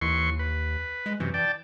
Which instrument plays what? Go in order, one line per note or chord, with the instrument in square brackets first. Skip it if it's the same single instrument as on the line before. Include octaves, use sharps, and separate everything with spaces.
[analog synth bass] D#2 [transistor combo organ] E3 C6 C#6
[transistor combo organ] B4
[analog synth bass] G#3
[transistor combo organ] F#2 C3 [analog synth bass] E3
[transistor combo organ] D5 G5 A5